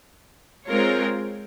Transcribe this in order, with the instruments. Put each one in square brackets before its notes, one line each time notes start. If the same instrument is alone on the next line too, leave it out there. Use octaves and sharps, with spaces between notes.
[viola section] G#3 C4 F4 A#4 C#5